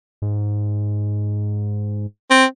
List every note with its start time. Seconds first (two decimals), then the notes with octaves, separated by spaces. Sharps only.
0.22 G#2
2.30 C4